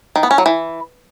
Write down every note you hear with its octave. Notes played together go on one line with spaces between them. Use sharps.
D#3
B3
C#4
F#3
E3